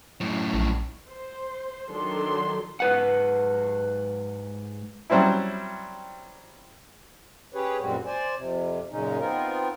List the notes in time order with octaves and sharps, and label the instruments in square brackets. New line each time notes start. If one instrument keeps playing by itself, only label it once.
[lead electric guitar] F#2 A2
[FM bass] A#1
[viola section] C5
D#3 F#3 D4 A4 C6
[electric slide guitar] G#2 B4 F#5
[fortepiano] F#3 G3 C4 C#4 E4
[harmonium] C#4 G4 G#4 B4 C#5
F#2 A#2 G3 G#3 C4 F#4
C5 D5 G#5
F2 C3
F#2 A#2 C#3 G#3 C#4 D#4
B3 C4 D#4 F4 A#4